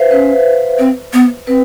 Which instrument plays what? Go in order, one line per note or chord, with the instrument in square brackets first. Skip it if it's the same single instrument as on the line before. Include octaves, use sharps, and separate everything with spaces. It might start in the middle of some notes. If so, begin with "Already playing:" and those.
Already playing: [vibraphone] B4 C5 E5 F5
[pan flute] C#4 [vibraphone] B4
[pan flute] C4
B3
[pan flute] C4 [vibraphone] B4